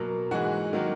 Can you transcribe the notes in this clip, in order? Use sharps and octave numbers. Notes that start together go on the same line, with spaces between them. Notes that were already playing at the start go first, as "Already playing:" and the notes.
Already playing: B2 F#3 A#3
G#2 E3 G#3 F#4
D#3 F#3 A#3